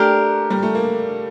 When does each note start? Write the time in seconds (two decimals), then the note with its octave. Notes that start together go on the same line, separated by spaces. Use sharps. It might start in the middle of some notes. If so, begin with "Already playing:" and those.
Already playing: A3 D4 G4 A#4
0.50 G3
0.63 A3
0.75 A#3